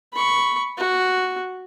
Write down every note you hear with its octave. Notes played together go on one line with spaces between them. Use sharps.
B5 C#6
F#4